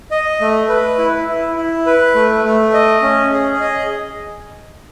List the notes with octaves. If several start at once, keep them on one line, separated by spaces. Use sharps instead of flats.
D#5
A3
B4
E4
E4
E4
B4
A3
A3
D#5
C#4
G#4
D#5